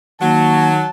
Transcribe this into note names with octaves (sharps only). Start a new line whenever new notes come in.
D#3 F#3 A#3 A5